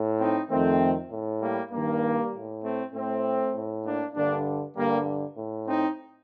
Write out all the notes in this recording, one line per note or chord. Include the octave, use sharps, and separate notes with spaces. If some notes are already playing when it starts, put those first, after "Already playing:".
Already playing: A2
C4 D#4
F2 D#3 A3 C4
A2
G3 A#3
G2 D#3 G3 A#3
A2
A3 C4
A2 A3 C4
A2
A#3 D4
G2 D3 A#3 D4
G2 D3 G3 A#3
A2
C4 D#4